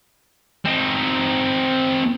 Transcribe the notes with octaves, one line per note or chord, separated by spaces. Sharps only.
C4 D#4